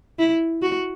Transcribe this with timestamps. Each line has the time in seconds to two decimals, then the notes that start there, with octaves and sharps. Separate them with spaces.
0.19 E4
0.62 F#4